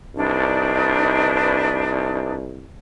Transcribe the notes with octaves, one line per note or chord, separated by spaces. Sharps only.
C2 D4 D#4 B4